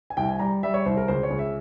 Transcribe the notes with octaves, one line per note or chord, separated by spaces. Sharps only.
G#5
C2 G5
G#5
G3 A#5
G3 E5
C#5
C2 C5
A#4
C#2 C5
C#5
C#2
E5